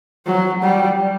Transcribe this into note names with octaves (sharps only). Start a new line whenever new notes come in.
F#3
G3